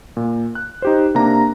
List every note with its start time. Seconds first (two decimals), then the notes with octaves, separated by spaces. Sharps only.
0.17 A#2
0.55 F#6
0.82 D#4 G4 C5
1.15 C3 A#3 D4 A#5